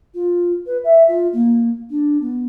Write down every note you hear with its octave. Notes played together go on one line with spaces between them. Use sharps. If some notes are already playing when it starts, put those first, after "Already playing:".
F4
B4
E5
F4
A#3
D4
B3